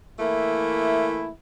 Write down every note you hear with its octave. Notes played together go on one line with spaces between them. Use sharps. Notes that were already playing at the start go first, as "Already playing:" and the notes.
E3 A3 A#3 E4